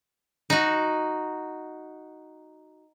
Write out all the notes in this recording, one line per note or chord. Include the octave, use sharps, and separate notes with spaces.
D#4 F#4